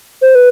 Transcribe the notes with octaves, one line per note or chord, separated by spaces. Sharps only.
C5
B4